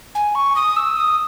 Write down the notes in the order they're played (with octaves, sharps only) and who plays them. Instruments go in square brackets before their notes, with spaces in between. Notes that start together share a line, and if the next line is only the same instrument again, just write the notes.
[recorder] G#5
C#6
D#6
E6
D#6